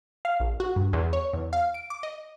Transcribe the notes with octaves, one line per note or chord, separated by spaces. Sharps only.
F5
A#1
F#4
G2
E2
C#5
E2
F5
D7
D6
D#5